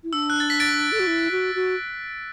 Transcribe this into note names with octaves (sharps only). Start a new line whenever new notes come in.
E4
D4 E6
F#6
A6
B6
A6 D7
A4
F#4
E4
F#4
F#4